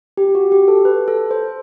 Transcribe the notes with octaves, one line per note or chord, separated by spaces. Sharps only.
G4
F#4
G4
A4
B4
A4
C5